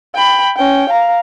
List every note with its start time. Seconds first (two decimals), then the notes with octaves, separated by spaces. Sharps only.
0.15 G5 B5
0.56 C#4 G5
0.89 F5 A#5